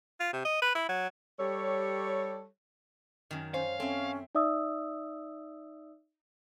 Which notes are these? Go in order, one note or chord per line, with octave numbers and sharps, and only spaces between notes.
F4
C3
D#5
B4
E4
F#3
G3 G4 A4 C#5
F#2 D#3
C#4 C5 F5
C4 C#4 A4 E5
D#4 D5 E5 D#6 E6